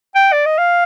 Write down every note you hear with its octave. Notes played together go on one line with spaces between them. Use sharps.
G5
D5
D#5
F5